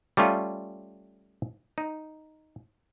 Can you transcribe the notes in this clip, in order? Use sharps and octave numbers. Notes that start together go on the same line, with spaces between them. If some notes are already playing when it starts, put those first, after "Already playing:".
G3 A3 C#4 F4
D#4